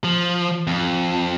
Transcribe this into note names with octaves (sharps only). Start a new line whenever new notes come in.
F3
F2